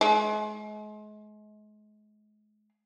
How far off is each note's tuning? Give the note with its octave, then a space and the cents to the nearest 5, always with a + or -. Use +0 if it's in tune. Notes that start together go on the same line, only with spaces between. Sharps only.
G#3 +35